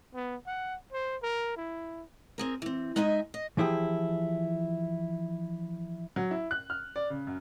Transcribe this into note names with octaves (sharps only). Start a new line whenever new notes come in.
B3
F#5
C5
A#4
E4
C4 G#4 A#4
E3 C4
G#3 D#4 D#5 E5 G#5
D#5
E3 F3 E4 G4 G#4
F#3
E4
F#6
F6
D5
C#3
F#2